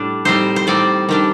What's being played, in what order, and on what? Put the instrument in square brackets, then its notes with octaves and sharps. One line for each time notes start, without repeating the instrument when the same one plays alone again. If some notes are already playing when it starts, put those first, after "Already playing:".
Already playing: [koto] A2 G3 D4
A2 G3 C4 D#4 C5
C5
A2 G3 C4 D#4 D5
D#3 G3 D4